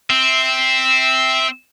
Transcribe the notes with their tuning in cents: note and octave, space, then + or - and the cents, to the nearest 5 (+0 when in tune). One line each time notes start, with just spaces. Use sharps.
C4 +0 E5 -10